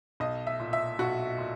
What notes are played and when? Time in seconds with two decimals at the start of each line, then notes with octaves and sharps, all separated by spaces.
0.20 B1 D#5
0.47 E5
0.60 A#2
0.73 E5
0.99 B1 F#4
1.38 A#2